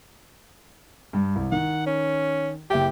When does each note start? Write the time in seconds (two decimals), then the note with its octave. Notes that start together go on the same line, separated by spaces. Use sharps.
1.13 G2
1.36 C2
1.52 D#3 F#5
1.86 C#4
2.70 F#1 G4 E5 G5